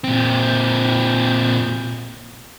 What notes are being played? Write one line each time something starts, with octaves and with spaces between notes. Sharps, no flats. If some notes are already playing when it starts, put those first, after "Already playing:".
A#2 C4